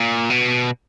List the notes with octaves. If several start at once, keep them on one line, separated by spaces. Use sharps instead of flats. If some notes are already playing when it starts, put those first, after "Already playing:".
Already playing: A#2
B2